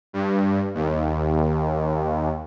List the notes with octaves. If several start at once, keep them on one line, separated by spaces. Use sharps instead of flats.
G2
D#2